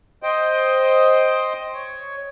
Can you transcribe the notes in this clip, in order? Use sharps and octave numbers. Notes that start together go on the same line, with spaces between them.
C5 D#5 G5
C#5